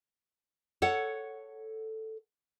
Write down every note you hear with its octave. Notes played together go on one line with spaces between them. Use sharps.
A4 C#5 F#5